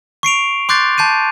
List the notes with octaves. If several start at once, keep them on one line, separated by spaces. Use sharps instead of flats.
C#6 C7 D7 F7
C6 D6 F#6 G6 A6 C7
A5 G6 C7 D#7